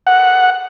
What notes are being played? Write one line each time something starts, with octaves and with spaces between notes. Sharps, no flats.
F#5